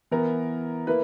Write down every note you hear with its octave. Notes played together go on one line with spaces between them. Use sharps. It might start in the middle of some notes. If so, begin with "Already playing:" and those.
E3 B3 E4 A#4
A#3 E4 B4